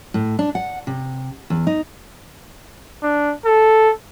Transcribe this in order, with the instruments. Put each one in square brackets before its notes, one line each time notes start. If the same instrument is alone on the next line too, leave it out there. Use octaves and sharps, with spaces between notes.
[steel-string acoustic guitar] A2
D4
F#5
C3
E2
D#4
[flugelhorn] D4
A4